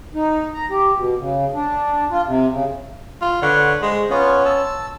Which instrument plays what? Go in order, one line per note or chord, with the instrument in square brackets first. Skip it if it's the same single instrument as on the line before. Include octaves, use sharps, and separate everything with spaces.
[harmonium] D#4
A#5
G4
B2
C#3
D4
F4
C3
C#3
[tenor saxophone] F4
[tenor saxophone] D3 [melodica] B4 C#5 F#5
[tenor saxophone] G#3 [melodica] C5
[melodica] B3 F4 [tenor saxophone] C#4
[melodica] A5 E6